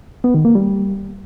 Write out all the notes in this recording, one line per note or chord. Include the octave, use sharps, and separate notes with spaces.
B3
D#3
A#3
G3